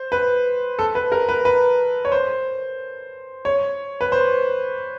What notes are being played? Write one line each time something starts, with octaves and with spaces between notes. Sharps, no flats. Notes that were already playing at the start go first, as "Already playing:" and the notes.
Already playing: C5
B4
A4
B4
A#4
B4
B4
C#5
C5
C#5
B4
C5